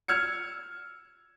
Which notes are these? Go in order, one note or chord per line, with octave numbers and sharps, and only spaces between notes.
E6 F6 G#6 C#7